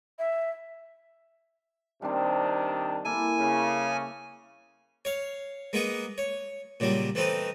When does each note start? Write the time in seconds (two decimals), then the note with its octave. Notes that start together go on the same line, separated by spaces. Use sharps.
0.19 E5
2.02 C3 D#3 G3 C4 D4
3.05 A#3 E4 A4 G#5
3.39 C#3
5.05 C#5 F5
5.73 G#3 A#3 B3 G#4 F#5
6.18 C#5
6.80 A#2 C#3 F#3 G3
7.15 E3 A3 C4 D#4 B4